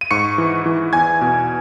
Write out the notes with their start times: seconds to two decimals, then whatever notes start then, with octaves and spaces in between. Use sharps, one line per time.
0.01 D#7
0.11 G#2 C#6 C#7
0.38 E3
0.66 E3
0.93 E2 G#5 G#6
1.21 B2